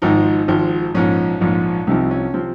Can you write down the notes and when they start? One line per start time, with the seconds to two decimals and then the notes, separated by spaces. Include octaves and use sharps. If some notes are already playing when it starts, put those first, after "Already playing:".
0.02 G#1 G#2 F3 D#4
0.48 G#1 G#2 F3
0.94 A#1 G#2 F3 C#4
1.41 A#1 G#2 F3
1.87 C2 C3 F3 D#4
2.11 C#4
2.34 C3 F3 C4